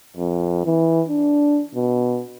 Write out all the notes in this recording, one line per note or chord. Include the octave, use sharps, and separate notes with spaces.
F2
E3
D4
B2